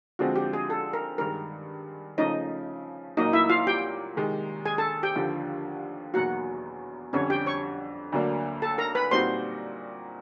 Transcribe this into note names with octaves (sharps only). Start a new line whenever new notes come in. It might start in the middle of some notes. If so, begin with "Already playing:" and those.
D3 F3 G#3 C4 F#4
G4
G#4
A4
A#4
G2 D#3 G#3 A#4
C#3 F3 A3 C#4 D#4 D#5
A#2 F#3 A#3 D#4 D#5
E4 E5
F4 F5
G4 G5
C3 D#3 G#3
G#4 G#5
A4 A5
G4 G5
D#2 D3 F3
E2 B2 F#3 A#3 D#4 F#4 F#5
F2 D3 G3 C#4 C#5
G4 G5
C#5 C#6
D2 D3 F#3 A#3 D4
A4 A5
A#4 A#5
B4 B5
A#2 G3 C4 D#4 F#4 C5 C6